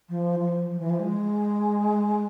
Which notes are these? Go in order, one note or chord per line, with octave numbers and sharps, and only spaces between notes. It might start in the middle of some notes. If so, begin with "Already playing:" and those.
F3
F3
F3
E3
F3
G#3